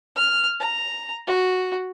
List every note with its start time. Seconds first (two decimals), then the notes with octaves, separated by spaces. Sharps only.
0.16 F6
0.60 A#5
1.27 F#4